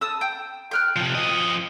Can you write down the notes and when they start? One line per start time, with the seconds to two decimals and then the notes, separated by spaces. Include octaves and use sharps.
0.01 A5 D#6 E6
0.21 G5
0.71 G5 F6 F#6
0.96 C3 F3
1.15 F3 D#5